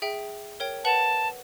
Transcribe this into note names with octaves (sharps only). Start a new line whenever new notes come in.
G#4 E5 G5
A#4 C#5 G5
B4 F#5 A5 F#7